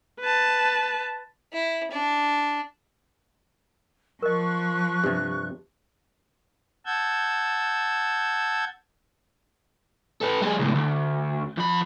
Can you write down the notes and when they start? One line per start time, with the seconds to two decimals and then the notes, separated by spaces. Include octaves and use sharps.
0.20 B4 A5
1.53 E4
1.92 D4
4.22 F3 A#4 D#5 C#6 F#6
5.04 G2 C3 G4
6.86 F#5 A5 E6 G6 G#6
10.21 A4 B4
10.41 G3 G#4
10.59 C#2 A2
10.75 D2
11.58 F2 B5